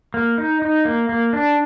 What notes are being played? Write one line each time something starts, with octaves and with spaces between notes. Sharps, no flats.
A#3
D#4
D#4
A#3
A#3
D4